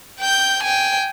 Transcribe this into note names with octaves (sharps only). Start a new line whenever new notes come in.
G5 G6
G5 G#5